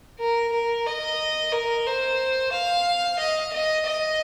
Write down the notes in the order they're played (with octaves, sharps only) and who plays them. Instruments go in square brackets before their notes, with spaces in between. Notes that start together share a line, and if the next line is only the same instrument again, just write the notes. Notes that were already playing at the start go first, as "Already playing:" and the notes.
[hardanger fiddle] A#4
A#4
D#5
A#4
C5
F5
D#5
D#5
D#5